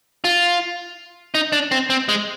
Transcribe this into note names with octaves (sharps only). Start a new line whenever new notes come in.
F4
D#4
D4
C4
C4
G#3